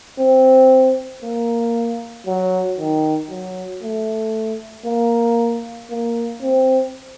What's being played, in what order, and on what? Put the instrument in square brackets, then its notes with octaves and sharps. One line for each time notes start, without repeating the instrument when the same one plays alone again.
[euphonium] C4
A#3
F#3
D#3
F#3
A3
A#3
A#3
C4